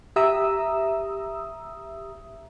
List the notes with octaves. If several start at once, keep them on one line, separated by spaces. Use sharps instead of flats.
G4 E5 A#5 D#6 E6